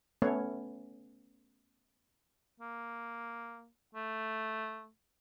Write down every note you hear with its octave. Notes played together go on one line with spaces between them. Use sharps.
A3 B3 C#4 C#5
A#3
A3